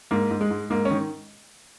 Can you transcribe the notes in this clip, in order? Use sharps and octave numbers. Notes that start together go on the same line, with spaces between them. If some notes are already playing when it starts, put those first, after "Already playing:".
G#2 A#3
G#2
G#3
G#2
G#2 A#3
C#4
D#3